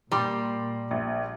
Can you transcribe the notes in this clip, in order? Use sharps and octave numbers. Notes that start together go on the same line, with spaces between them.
A#2 G3 A#5 C6 D6
A#1